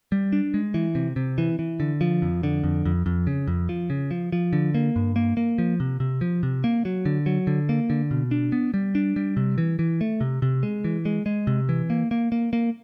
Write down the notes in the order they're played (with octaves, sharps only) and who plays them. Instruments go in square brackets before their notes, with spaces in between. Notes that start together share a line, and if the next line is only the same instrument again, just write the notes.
[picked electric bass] G3
D4
G#3
E3
C3
C3
E3
E3
D3
F3
F2
D3
F2
F2
F2
C#3
F2
F3
C#3
F3
F3
D3
A#3
G2
A#3
A#3
F3
C3
C3
F3
C3
A#3
F#3
D3
F#3
D3
A#3
D3
B2
D4
B3
G3
D4
G3
C3
E3
E3
A3
C3
C3
G#3
E3
G#3
G#3
C3
E3
A#3
A#3
A#3
A#3